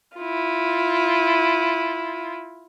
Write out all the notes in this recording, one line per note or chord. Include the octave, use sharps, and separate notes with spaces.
E4 F4